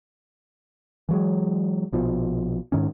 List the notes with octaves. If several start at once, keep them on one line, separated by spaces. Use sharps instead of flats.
E3 F#3 G#3
A#1 B2 F3
G#2 D#3 C#4